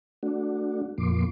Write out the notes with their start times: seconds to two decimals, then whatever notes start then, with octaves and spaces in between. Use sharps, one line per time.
0.23 A3 D4 F#4
0.98 F2 A#2 F3 A#3 C6 D6